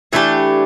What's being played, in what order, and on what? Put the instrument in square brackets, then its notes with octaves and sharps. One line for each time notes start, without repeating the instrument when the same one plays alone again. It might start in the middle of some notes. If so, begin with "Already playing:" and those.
[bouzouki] E3 A3 D4 G4